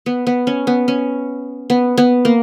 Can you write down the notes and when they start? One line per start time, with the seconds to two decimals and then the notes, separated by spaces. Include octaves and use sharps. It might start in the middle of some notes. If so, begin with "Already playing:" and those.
0.06 B3
0.27 B3
0.47 C#4
0.67 B3
0.88 C#4
1.70 B3
1.98 B3
2.25 A#3